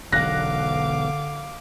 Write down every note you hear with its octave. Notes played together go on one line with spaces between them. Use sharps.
E1 B1 D3 F5 D6 F#6 A#6